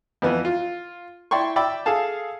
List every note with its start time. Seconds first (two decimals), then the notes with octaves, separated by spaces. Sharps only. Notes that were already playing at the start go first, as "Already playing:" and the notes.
0.22 F2 E3 B3
0.45 F4
1.31 E4 D5 G5 C6 C#6
1.56 D5 E5 G5 B5 D6 E6
1.86 G#4 A4 F5 A5